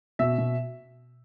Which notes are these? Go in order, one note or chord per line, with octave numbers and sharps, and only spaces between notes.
B2 E5
B2